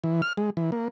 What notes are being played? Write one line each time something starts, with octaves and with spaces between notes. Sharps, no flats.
E3
F6
G#3
E3
A#3